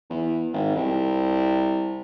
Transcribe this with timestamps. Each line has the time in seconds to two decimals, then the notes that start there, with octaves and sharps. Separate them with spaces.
0.10 E2
0.53 G#1
0.76 C2